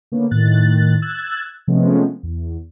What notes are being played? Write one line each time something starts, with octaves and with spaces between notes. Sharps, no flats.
D3 A#3 B3 C#4
A2 D#3 F#6 A6
E6 F#6 G#6 A6
C3 F3 G#3 A3 B3 C#4
E2